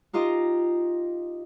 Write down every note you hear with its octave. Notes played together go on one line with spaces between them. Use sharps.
D#4 F4 G4 D#5